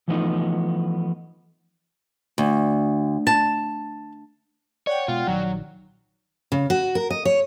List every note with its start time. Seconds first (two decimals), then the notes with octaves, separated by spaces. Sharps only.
0.08 E3 F3 A3 B3 D4 D#4
2.38 D2
3.27 A5
4.87 C#5 D5 F#5 G5
5.08 B2 G#3 F4
5.27 A#1 D#3 F#3
6.52 C#3
6.70 F#4
6.95 A#4
7.10 D#5
7.25 C#5